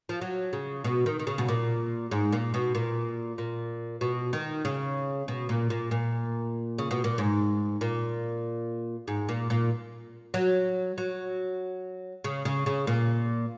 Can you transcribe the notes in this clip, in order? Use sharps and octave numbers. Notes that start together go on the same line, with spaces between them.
F3
F#3
C#3
B2
D#3
D#3
C#3
B2
A#2
G#2
A#2
B2
A#2
A#2
B2
D#3
C#3
B2
A#2
A#2
A#2
C#3
B2
A#2
G#2
A#2
G#2
A#2
A#2
F#3
F#3
C#3
C#3
C#3
A#2